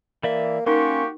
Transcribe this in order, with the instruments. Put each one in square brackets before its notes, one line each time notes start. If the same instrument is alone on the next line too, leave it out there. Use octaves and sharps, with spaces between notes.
[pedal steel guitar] E3 D5 E5 [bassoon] A#3
[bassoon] A#3 [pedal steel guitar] C#4 C6 [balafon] D#4 A#4 [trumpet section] F#4 G4 C#6